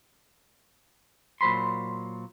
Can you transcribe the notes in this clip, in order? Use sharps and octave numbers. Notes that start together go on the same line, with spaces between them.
A#2 F#3 C5 B5 C6